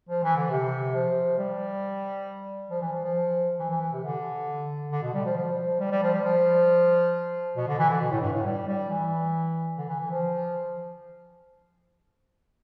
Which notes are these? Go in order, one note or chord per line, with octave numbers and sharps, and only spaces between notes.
F3
E3
D3
C3
F3
G3
F3
E3
F3
F3
E3
E3
E3
C3
D3
D3
B2
G3
F3
F3
G3
G3
F3
G3
F3
B2
D3
E3
D3
B2
A2
G2
A2
G3
G3
E3
D3
E3
E3
F3